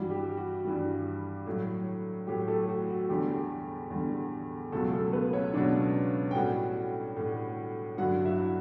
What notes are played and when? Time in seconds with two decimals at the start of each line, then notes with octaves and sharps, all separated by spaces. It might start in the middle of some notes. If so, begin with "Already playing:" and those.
Already playing: G2 E3 G3 F#4
0.10 G4
0.37 F#4
0.65 G2 E3 G3
1.47 A2 F#3
2.27 A2 F#3 G4
2.48 A3 A4
2.69 F#4
2.89 F#4
3.09 E2 D3 G3 G4
3.90 E2 D3 G3
4.72 C#2 B2 F#3 A3 A4
4.92 A3 A4
5.13 B3 B4
5.33 C#4 C#5
5.53 C#2 B2 F#3 D4 D5
6.31 G5
6.35 A2 G3 F#4 F#5
7.16 A2 G3
7.98 G2 D3 F#3 F#4 F#5
8.25 E4 E5